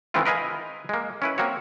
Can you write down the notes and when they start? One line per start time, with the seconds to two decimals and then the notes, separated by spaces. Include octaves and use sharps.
0.14 D#3 E3 G#3 C4 E4 F4
0.26 A#4 B4 D#5 F5 G#5 A#5
0.89 G#3 A#3
1.22 C#4 E4 B4
1.38 A#3 C4 F#4 C#5